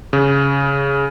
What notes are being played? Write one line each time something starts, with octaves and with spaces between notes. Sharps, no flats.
C#3